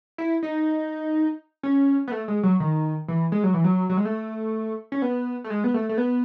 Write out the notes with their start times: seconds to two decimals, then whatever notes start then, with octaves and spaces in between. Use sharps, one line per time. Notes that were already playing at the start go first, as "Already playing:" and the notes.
0.18 E4
0.43 D#4
1.63 C#4
2.08 B3
2.12 A3
2.28 G#3
2.43 F#3
2.60 D#3
3.08 E3
3.32 G#3
3.44 F#3
3.54 E3
3.64 F#3
3.89 F#3
3.97 G#3
4.05 A3
4.92 C#4
5.02 B3
5.44 A3
5.50 G#3
5.64 B3
5.74 A3
5.89 A3
5.98 B3